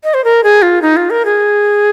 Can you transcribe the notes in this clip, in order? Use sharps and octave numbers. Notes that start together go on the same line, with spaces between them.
D#5
C5
A#4
G#4
F4
D#4
F4
A#4
G#4